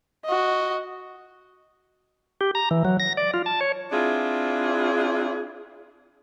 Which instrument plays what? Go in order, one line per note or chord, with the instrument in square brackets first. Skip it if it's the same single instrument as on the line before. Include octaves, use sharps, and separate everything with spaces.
[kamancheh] F#4 D#5
[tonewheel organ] G4
A#5
E3
F#3
A#6
D5
F4
A5
C#5
[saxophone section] C4 D4 E4 F4 G#4